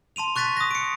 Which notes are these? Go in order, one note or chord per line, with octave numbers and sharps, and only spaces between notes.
A5 C6 D#7 F7
C#6 F#6 A6 B6 D#7
D#6 A#6
C#7 D7